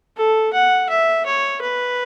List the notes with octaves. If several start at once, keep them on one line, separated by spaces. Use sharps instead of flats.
A4
F#5
E5
C#5
B4